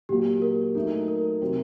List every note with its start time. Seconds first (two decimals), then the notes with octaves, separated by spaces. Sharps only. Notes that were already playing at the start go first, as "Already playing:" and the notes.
0.09 A#2 F#3 A#3 F#4 G4
0.42 A#4
0.75 F#3 A3 D#4
1.08 A#4
1.41 C3 F#3 C4